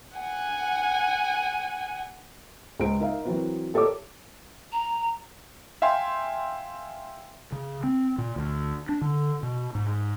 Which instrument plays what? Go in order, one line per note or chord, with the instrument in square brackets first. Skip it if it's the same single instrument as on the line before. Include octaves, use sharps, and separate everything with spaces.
[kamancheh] F#5 G#5
[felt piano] C#2 G#3 C5 D7
D#4 A#4 E5 F5
E3 F#3 C4 F#4 A#4 B4
G4 A4 A#4 C#5 D6
[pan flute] A#5
[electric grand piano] E5 F5 G5 G#5 C6
[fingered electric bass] C#3
C4
A#2
D2
D4
D3
B2
G#2